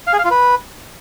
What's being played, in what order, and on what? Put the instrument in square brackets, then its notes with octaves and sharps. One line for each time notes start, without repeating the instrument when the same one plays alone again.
[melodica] F5
G#4
F5
F4
B4